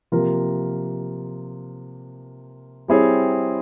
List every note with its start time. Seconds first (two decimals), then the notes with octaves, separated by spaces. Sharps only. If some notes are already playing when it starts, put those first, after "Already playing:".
0.12 C3 F3 A#3 F4 A#4
2.88 G3 C4 E4 G#4 C#5